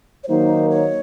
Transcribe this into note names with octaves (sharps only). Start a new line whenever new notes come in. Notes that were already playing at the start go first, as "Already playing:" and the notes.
C#5
D#3 F#3 A#3 D#4 C5
C#5